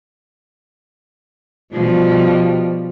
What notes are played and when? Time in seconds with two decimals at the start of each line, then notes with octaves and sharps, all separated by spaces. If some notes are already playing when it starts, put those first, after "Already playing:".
1.73 B2 F3 G3